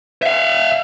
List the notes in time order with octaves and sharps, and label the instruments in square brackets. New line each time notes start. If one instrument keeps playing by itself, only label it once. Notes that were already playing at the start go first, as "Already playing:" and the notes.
[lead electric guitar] E5 F5